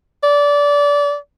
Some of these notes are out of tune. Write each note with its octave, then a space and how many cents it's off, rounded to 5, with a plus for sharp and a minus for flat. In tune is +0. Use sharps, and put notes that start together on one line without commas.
D5 -25